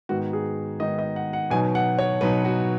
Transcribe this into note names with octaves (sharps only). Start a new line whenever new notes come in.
G#2 D#3 B3 D#4 F#4
G#4
G#2 D#3 B3 D#4 D#5
D#5
F#5
F#5
B2 F#3 D#4 G#5
F#5
C#5
B2 F#3 D#4 B4
F#4